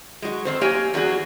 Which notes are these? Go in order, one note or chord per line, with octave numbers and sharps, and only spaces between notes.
F#3 G#3
F2 C4 C5
A#3 G4 C#5 G#5
E2 F#3 F#4 G#4